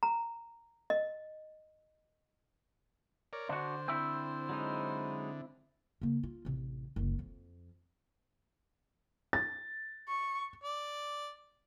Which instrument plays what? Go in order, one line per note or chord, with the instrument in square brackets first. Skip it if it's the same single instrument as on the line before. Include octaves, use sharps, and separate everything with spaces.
[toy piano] A#5
D#5
[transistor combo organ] A#4 C#5 D5
[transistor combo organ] D3 [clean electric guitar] D4 F#4 [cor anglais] C5
[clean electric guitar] C4 E4 [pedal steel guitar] E6 G6
[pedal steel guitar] F#3 G#3 D#4
[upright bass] C#3 A#3
F4
A1 C3
F#1 C2
F2
[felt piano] A6
[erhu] C#6
[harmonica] D5